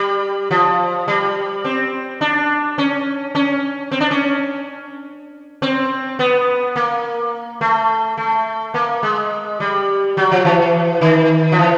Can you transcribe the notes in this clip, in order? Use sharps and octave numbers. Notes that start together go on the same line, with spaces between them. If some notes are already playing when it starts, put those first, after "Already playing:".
Already playing: G3
F3
G3
C4
D4
C#4
C#4
C4
D4
C#4
C4
B3
A#3
A3
A3
A#3
G#3
G3
F#3
F3
E3
D#3
F3
E3